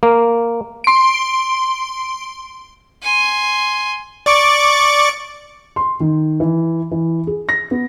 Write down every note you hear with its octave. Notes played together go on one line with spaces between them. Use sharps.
A#3
C6 D7
G#5 C6
D5 C#6 D6
C6
D#3
E3
E3
G#4
A#6
B3